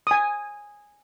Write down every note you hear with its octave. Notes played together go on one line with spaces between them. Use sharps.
G#5 D#6